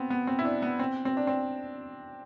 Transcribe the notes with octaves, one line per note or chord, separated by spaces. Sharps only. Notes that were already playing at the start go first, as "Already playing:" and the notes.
Already playing: B3 C4
B3
C4
E4
D4
B3
C4
C4
D4
C4